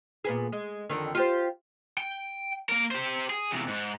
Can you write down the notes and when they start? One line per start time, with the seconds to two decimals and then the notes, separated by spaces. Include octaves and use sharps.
0.24 A#2 B3 G#4
0.52 G#3
0.89 F2 D3 D#3
1.15 F4 G4 C5
1.98 G5
2.69 A#3 A#4
2.91 G4 C5
3.30 G#4
3.52 E2 C3
3.68 G#2